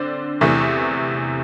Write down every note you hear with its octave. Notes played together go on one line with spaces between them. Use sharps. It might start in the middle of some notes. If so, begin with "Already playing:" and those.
Already playing: D3 C4 D5
E2 C3 E3 A3